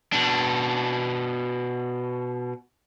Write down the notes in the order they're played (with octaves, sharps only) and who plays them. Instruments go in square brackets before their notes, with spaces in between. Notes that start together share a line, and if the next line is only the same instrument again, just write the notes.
[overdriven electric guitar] B2 D4